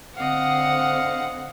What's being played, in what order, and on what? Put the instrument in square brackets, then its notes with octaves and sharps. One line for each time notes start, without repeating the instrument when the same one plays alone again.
[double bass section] D3 C4 [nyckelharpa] D#5 F5 [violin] F#5